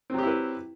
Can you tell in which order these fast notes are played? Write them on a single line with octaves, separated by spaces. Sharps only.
C4 F#3 G4 E4 B4